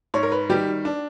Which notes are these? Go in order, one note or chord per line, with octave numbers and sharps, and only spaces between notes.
G#2 C#5
A#4
B4
D#3 G3 G4
D4